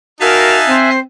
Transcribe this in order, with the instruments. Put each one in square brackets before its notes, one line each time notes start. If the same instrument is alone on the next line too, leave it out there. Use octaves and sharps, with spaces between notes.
[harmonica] D#4 F5 A5 [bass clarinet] F#4 [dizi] A#4 [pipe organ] E5 G#5 F#6
[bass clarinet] C4 [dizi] C5